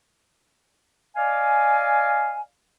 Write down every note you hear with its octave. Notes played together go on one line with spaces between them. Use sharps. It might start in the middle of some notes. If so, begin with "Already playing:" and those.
D5 D#5 F5 G#5